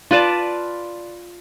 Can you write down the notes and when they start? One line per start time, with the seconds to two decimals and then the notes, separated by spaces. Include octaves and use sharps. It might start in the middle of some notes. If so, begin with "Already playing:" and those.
0.11 F4 B4 D5 A5